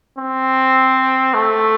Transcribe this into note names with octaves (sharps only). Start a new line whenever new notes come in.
C4
A3